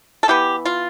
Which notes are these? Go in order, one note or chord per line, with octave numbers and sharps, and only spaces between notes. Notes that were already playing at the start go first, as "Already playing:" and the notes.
A4
E3 B3 G4
F4